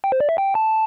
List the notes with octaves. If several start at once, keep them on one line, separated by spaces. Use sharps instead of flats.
G5
C5
D5
E5
G5
A5